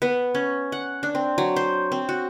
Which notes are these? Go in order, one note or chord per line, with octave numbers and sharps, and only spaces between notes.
B3
C#4
F#5
D4
C4
F#3
C5
C4
F#4